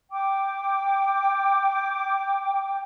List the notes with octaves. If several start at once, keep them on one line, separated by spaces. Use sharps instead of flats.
G5 D6